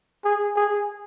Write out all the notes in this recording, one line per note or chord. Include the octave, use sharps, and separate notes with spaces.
G#4
G#4